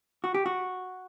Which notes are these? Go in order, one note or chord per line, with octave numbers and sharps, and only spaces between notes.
F#4
G4
F#4